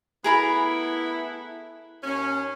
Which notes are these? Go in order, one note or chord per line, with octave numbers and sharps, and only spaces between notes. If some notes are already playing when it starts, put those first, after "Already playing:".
A3 B3 E4 G#4 A#4 B5
D#2 C#4